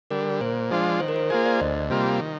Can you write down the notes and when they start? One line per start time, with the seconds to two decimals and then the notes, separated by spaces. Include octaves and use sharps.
0.10 D3 G3 A#4
0.41 A#2 C5
0.71 F3 G#3 D4 F4
1.00 D#3 C5
1.08 A#4
1.16 C5
1.30 A#3 F4 G#4 C5
1.45 D5
1.60 D2 D#5
1.90 C3 G3 A#3 F4
2.21 D#3